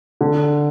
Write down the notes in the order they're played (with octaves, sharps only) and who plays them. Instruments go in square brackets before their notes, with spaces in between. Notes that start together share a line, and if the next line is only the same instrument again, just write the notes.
[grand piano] D3